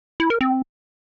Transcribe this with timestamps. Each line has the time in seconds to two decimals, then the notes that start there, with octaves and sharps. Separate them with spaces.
0.20 E4
0.30 A#4
0.41 C4